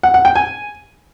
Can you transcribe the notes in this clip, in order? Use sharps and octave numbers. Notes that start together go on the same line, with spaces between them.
F#5
F#5
G5
G#5